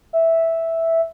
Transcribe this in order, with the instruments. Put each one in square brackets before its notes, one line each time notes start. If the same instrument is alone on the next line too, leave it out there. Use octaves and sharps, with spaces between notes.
[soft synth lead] E5